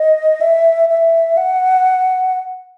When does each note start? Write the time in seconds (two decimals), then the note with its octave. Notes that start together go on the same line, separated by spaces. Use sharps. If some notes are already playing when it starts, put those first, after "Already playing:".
Already playing: D#5
0.41 E5
0.90 E5
1.37 F#5